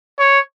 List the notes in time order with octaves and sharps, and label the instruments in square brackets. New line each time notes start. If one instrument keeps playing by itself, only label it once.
[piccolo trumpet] C#5